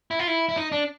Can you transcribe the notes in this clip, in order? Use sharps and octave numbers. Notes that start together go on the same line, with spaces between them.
E4
F4
E4
E4
D#4
D4